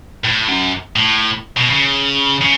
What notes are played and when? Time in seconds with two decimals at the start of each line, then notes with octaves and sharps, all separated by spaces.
0.24 A2
0.48 F#2
0.96 A2
1.57 B2
1.70 C#3
2.42 C#3